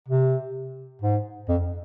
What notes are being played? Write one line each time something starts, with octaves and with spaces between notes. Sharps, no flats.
C3
G#2
F2